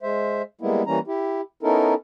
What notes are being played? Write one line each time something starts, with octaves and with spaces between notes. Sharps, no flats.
G#3 C5 E5
G3 G#3 A#3 B3 E4
E3 G3 A#3 C#4 A#5
E4 G4
B3 C#4 D#4 E4 A4 A#4